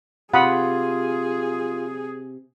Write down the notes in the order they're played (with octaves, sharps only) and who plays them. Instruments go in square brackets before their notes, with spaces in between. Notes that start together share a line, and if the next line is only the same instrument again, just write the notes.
[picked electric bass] C3 [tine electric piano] F4 [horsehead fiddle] G#4 [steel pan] F#5 B5 D#6